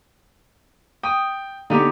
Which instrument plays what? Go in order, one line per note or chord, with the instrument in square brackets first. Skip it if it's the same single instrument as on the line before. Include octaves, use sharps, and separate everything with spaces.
[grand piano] G5 [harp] D#6
[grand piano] D3 G4 [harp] B3 D#4